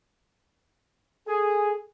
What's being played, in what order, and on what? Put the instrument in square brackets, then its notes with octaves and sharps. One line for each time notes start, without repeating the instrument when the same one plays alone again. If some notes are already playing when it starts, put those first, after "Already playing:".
[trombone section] G#4 [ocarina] A4